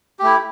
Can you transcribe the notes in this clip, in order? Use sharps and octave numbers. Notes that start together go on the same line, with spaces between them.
A3 E4 G4